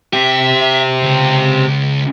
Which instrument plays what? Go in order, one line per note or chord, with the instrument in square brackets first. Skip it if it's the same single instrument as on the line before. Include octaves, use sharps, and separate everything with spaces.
[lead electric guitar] C4 G4 [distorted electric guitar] E5
[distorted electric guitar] C#2